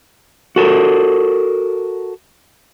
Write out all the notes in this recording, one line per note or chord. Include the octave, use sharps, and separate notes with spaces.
F#4 A4 A#4